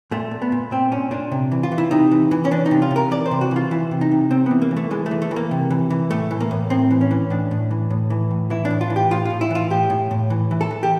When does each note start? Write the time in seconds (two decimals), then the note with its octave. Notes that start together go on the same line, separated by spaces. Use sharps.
0.11 A#2 A3
0.31 A#2
0.42 B3
0.52 A#2
0.71 A#2 C4
0.92 A#2 C#4
1.11 A#2 D4
1.31 C3
1.52 E3
1.63 F4
1.72 E3
1.78 E4
1.91 C3 D#4
2.11 E3
2.31 E3
2.45 C#4
2.51 E3 D4
2.66 D#4
2.71 C3
2.82 F4
2.91 C3
2.96 A#4
3.11 E3 D5
3.26 C5
3.31 C3
3.41 F#4
3.51 E3 F4
3.71 E3 E4
3.91 C3
4.01 D#4
4.11 C3
4.31 C3 C4
4.46 E3 B3
4.62 A#3
4.71 E3
4.77 A3
4.91 E3 G#3
5.06 A3
5.11 E3
5.22 A3
5.31 E3
5.36 A#3
5.51 C3
5.70 E3
5.90 E3
6.11 A2 A3
6.31 E3
6.40 A#3
6.51 A2
6.70 A2 C4
6.91 E3
7.01 C#4
7.11 E3
7.30 A2 D4
7.51 A2
7.71 E3
7.90 A2
8.10 E3
8.31 A2
8.50 E3 E4
8.65 D4
8.71 A2
8.81 F4
8.90 E3
8.96 G4
9.11 A2 F4
9.25 A2 F4
9.41 E4
9.51 E3 F4
9.70 A2 G4
9.90 A2
10.11 A2
10.30 E3
10.51 E3
10.61 A4
10.71 E3
10.83 G4